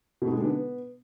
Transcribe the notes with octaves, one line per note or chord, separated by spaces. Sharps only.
B2
D#4
G#3
D3
B3